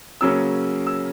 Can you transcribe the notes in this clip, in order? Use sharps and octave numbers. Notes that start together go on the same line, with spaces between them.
C#3 F#3 A#3 C#4 E6
E6